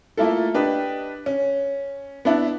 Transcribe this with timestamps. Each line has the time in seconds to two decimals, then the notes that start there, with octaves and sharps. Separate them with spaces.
0.17 A3 A#3 E4 F4 A4
0.54 D4 G4 B4 D#5
1.26 C#4
2.25 B3 D4 E4